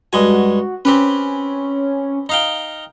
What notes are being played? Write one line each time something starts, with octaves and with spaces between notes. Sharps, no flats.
G2 G#3 F#4 G#5
C4 C#4 G4 B4
D#4 F5 G5